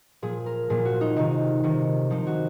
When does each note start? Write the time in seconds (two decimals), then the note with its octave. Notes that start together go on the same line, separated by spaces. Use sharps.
0.22 A#2 F3 G#4
0.46 A#4
0.70 A#2 F3 G#4
0.85 F#4
1.01 D#4
1.16 C3 D#3 D#4
1.63 C3 D#3
2.10 C3 F3 D#4
2.27 F#4